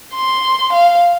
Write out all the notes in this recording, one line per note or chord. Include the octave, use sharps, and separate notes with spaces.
C6
F5